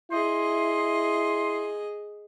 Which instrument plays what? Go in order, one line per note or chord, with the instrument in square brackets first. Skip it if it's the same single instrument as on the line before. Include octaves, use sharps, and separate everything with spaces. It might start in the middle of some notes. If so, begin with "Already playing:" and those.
[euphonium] E4 [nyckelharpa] G#4 D#5 [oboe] C6